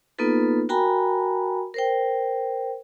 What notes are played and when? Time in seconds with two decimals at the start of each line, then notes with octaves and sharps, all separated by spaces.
0.19 A#3 B3 D#4 F4 A4 B4
0.69 F#4 A#4 G5 G#5 A#5 B5
1.74 A#4 C5 G5